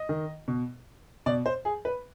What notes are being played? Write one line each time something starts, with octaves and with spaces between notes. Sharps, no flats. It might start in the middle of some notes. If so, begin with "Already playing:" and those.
Already playing: D#5
D#3
B2
B2 D5
C5
G#4
B4